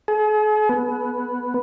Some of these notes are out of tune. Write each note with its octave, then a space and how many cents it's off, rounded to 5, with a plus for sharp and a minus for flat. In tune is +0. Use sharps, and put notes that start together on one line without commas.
G#4 +45
B3 -5